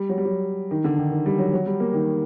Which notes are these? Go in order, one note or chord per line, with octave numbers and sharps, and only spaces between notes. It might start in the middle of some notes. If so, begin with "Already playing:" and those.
Already playing: G3
F#3
G3
F#3
D#3
D3
D#3
D#3
G3
F#3
F#3
G3
A#3
D#3